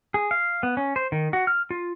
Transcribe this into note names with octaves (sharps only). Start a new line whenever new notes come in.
G#4
F5
B3
C#4
C5
D#3
F#4
F6
F4